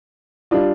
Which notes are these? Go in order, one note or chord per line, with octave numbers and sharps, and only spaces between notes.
G3 D4 F4